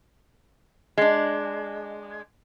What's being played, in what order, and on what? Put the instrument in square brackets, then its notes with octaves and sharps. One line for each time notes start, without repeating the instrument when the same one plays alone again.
[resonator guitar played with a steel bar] G#3 D4